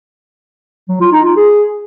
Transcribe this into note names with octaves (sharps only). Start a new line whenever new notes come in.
F#3
F4
D#4
F4
G#4